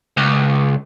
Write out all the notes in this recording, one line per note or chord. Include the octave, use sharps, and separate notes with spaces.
C#2